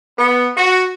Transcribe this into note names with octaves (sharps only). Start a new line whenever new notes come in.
B3
F#4